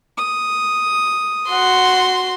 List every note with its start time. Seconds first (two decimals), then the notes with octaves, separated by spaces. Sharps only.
0.17 D#6
1.49 F#4 F#5 C6